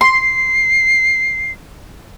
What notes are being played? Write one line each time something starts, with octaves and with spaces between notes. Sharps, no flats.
C6 C7